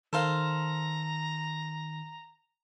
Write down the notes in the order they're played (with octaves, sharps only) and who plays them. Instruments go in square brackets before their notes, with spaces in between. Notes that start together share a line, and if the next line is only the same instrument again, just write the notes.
[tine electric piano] D#3 [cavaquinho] A4 C5 F5 [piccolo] A#5